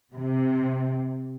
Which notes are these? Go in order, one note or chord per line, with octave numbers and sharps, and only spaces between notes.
C3